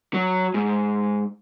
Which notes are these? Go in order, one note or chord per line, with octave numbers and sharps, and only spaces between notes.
F#3
G#2